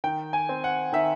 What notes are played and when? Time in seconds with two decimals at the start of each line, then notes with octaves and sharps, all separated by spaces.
0.04 D#3 G5
0.33 G#5
0.49 C4
0.64 F#5
0.92 D#3 E5